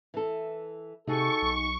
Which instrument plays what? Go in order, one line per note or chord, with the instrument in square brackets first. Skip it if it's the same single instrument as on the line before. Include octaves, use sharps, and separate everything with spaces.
[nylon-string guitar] E3 A4
[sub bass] C3 [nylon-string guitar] D#4 F#4 G#4 [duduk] A4 [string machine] C#6
[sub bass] B1